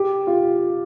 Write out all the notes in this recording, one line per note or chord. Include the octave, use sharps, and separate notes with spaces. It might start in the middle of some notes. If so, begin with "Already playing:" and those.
Already playing: G4
F4